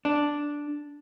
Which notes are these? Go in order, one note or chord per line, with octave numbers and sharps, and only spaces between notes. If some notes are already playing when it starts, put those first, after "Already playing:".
D4